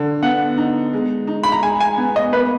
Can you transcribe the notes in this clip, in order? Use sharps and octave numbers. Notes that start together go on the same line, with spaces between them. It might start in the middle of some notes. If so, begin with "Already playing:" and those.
Already playing: D3
B3 F#5
D#4
G#3
D#4
B5
A#5
G#3 G#5
G#5
B3
D#5
A#3 B4